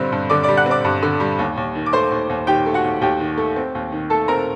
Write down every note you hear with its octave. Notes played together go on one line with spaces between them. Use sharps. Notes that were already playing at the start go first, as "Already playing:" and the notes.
Already playing: G2 D3 G3 C4
G2
D3 D5 D6
G3 D5 D6
F#5 F#6
C4
D5 D6
G2
D3
G3
D#2
D#2
D#3
D6
A3 C5 C6
D#2
D#2
D#3 G4 G5
A3
F#4 F#5
D#2
D#2 G4 G5
D#3
A3
C4
D#2
D#3
A3 A4 A5
C4 A#4 A#5